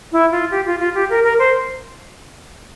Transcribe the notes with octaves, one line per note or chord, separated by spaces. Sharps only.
E4
F4
G4
F4
F4
G4
A#4
A#4
C5